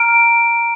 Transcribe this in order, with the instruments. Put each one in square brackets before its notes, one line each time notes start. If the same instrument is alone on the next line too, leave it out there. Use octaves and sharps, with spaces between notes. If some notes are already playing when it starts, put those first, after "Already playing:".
Already playing: [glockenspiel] A#5 F6 D7